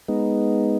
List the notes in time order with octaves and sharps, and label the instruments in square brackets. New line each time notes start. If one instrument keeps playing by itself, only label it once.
[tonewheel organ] G#3 B3 D#4